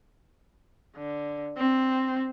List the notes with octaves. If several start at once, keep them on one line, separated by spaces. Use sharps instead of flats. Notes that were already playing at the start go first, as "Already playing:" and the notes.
D3
C4